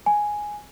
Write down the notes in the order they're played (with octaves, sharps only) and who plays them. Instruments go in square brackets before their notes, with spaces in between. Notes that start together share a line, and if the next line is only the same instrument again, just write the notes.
[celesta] G#5